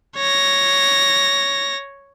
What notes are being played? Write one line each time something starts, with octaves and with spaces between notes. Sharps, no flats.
C#5 A#6